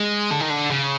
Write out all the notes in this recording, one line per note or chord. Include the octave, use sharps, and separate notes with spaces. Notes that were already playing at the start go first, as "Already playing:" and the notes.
Already playing: G#3
D3
D#3
D3
C#3